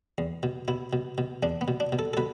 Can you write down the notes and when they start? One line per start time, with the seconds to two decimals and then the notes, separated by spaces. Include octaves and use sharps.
0.18 E2
0.43 B2
0.68 B2 E4
0.93 B2
1.18 B2
1.43 E2 D4
1.61 B3
1.68 B2
1.80 D4
1.92 B2
1.99 A4
2.13 A4
2.17 B2 B4